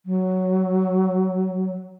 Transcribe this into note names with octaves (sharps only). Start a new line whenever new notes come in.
F#3